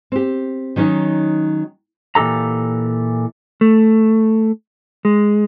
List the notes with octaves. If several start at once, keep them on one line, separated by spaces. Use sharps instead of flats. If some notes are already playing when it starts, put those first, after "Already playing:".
C4 G4
D#3 F#3 C#4 D#4
A#2 E3 G4 A4 A#5
A3
G#3